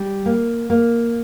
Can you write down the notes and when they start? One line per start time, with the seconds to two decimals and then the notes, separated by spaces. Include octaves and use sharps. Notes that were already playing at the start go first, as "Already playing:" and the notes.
Already playing: G3
0.26 A#3
0.70 A#3